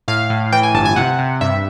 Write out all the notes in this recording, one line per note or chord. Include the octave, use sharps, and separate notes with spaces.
A2 F5
A2
E3 G5
G#5
G1 A5
G#5
C3 F#5
C3
G2 E5